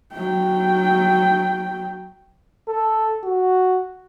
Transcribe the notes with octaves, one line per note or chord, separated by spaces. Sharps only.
F#3 G5
A4
F#4